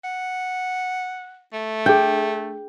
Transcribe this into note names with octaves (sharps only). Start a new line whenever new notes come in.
F#5
A3
D4 G#4 G5